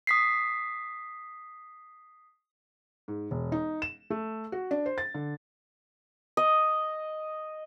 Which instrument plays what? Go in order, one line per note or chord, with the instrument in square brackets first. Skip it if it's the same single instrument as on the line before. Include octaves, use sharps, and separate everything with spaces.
[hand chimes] D#6 B6 C7
[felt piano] G#2
E1
D#4
E7
A3
F#4
D4
C5
A6
D3
[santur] D#5